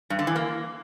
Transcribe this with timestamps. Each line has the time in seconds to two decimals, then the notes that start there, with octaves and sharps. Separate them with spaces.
0.10 G2
0.19 D3
0.27 E3
0.36 A#3